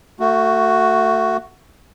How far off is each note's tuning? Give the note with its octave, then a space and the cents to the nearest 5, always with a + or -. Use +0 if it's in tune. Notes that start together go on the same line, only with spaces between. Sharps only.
A3 +30 F#4 +0